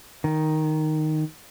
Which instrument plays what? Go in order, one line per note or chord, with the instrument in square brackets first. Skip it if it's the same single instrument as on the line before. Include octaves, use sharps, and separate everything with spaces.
[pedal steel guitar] D#3